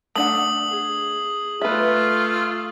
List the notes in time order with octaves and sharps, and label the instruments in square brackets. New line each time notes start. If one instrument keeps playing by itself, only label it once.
[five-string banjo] A3 D4 F#5 [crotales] D#6 F#7
[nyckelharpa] G#4
[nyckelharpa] A3 [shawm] F4 [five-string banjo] B4 E5